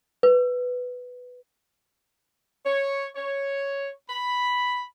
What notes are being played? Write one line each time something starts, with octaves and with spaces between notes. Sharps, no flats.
B4
C#5
C#5
B5